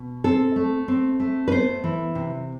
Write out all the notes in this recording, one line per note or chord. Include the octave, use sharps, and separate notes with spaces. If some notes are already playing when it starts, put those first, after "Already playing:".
Already playing: B2
C4 A4
A3
C4
A3
B4
B3 C5
E3
C3